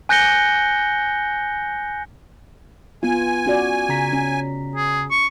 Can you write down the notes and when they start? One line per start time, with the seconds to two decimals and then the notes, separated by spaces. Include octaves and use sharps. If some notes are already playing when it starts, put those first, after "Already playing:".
0.09 G#5 F#6 G6 A#6 C#7 G7
3.03 B3 F4 G#5
3.46 C#4 F#4 D5
3.89 C#3 A#5 B6
4.13 C#4
4.76 G#4
5.11 C#6